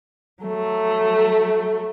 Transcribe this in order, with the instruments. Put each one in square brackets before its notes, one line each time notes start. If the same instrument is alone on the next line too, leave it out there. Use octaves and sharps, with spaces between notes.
[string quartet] F#3 A3